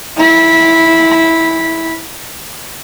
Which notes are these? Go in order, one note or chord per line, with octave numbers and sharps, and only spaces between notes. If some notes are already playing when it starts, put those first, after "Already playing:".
E4 B5